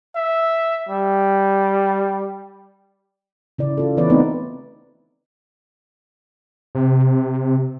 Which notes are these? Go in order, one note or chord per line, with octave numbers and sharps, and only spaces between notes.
E5
G3
C#3 E4 D5
F4 A4
E3 B3 E4 B4 C#5 D5
A3 B3 C4 D#4 B4
C3